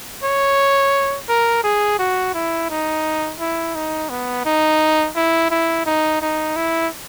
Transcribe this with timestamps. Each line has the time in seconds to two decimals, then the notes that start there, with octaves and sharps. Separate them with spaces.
0.24 C#5
1.29 A#4
1.64 G#4
1.99 F#4
2.34 E4
2.70 D#4
3.40 E4
3.75 D#4
4.10 B3
4.45 D#4
5.16 E4
5.51 E4
5.86 D#4
6.22 D#4
6.56 E4